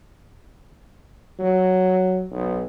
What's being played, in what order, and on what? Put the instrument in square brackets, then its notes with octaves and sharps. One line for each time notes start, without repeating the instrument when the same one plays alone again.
[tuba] F#3
B1